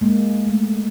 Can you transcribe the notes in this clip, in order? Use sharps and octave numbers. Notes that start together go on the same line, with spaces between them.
G#3 A#3
G#3 A3